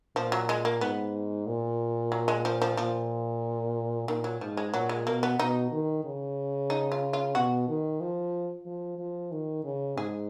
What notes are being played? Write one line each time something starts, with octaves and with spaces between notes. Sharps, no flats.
A#2 F3
F#3
G#3
A#3
G#2 B3
A#2
F#3
G#3
F3
F3
A#2 F3
A#2 D#3
F#3
G#2 F3
G#3
A#2 F#3
G#3
B2 A#3
B3
B2 D#4
D#3
C#3
D#4
F4
F4
B2 F#4
D#3
F3
F3
F3
D#3
C#3
G#2 G#4